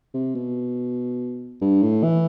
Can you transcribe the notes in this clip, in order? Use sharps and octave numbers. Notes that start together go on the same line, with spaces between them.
C3
B2
G2
A2
E3